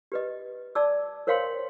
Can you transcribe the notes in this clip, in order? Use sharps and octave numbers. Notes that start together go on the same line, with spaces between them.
G4 B4 D#5
D5 A5 D6 E6
A#4 C5 C#5 F5 G5 C6